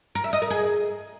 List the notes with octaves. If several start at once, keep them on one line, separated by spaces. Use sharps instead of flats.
A#4
E5
D#5
A#4
G#4